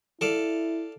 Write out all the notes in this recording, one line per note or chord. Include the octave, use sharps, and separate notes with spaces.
E4 A4 D5 F5